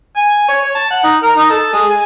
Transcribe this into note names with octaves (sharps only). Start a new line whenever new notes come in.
G#5
C#5
C#5
A5
F#5
D#4
A#4
D#4
A4
G#3
G#5